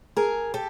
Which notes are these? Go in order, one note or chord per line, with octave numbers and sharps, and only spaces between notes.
G#4 A#4
G4 A4